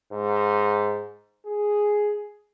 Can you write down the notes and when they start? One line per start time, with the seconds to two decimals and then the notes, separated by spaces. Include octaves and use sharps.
0.13 G#2
1.46 G#4